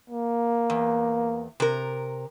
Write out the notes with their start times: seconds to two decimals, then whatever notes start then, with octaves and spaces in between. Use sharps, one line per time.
0.10 A#3
0.70 E2
1.60 C3 A#4